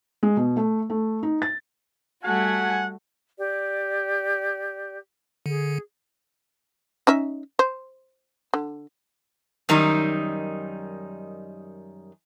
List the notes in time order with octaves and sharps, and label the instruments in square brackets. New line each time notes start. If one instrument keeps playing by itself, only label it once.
[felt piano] G#3
B2
A3
A3
D#4
A6
[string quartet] G3 A3 F#4 [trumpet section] F#5 G#5
[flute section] G4 D5
[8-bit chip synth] D3 [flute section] G#4
[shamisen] C#4 D#4 E5
C5
D3
[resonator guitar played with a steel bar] F#2 D#3 G3 D#4